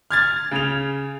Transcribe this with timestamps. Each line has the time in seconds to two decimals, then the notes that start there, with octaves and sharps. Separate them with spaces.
0.11 F6 G#6 A6
0.51 C#3 F7